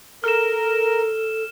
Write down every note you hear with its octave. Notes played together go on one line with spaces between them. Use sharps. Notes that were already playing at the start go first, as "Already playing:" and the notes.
A4 A#4 F6 E7